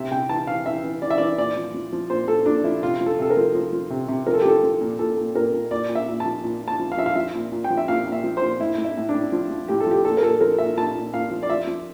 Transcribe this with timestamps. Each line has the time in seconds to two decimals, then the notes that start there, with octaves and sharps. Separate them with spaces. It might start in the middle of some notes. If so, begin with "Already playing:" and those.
Already playing: C3 E5
0.11 C3 G5
0.29 E3 A5
0.47 E3 F5
0.65 E3 E5
0.83 E3
1.02 E3 D5
1.10 E5
1.18 E3 D5
1.38 A#2 D5
1.56 F3
1.74 F3
1.93 F3
2.10 A#2 C5
2.28 A#2 A4
2.46 A#2 D4
2.64 F3 E4
2.83 C3 F4
3.01 F3
3.06 A4
3.19 C3 A4
3.30 A#4
3.37 F3
3.55 F3
3.73 F3
3.90 C3
4.08 C3
4.27 F3 A#4
4.34 A4
4.42 G4
4.45 F3 A4
4.63 F3
4.81 A#2
4.99 A#2 A4
5.17 A#2
5.35 A#2 A#4
5.54 A#2
5.71 A#2 D5
5.89 A#2
5.95 E5
6.08 A#2
6.20 A5
6.25 F3
6.44 A#2
6.61 A#2
6.68 A5
6.79 F3
6.92 F5
6.97 F3 E5
7.06 F5
7.16 F3 E5
7.34 A#2
7.52 A#2
7.64 G5
7.70 F3
7.77 E5
7.88 A#2 F5
8.06 A#2
8.12 E5
8.24 F3
8.37 C5
8.42 A#2
8.60 A2 E4
8.78 A2
8.84 E4
8.97 A2
9.09 D4
9.14 A2
9.32 F3
9.51 F3
9.68 A2 G4
9.80 A4
9.87 F3 G4
10.05 A#2 A4
10.17 A#4
10.23 A#2 A4
10.41 F3 A#4
10.58 A#2 E5
10.77 A#2 A5
10.95 A#2
11.13 A#2 F5
11.31 F3
11.43 D5
11.49 F3 E5
11.67 F3